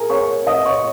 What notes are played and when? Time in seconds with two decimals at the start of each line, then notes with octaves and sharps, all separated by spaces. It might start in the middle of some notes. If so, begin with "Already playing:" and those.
Already playing: G#4 A#4 G#5 A#5
0.10 C#5 C#6
0.47 D#5 D#6
0.65 C#5 C#6